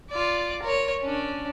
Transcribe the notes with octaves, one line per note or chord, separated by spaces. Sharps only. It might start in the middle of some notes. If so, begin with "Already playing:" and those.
F4 D5
A#4 C#5
C#4 D4